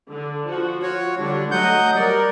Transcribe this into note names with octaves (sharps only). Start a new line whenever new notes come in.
D3
F3 F#4
F4 F#4 C#5
D3 G3 D4
F#3 A3 D#5 F#5 G6
G3 A#4 D5